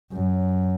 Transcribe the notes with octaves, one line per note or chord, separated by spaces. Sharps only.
F#2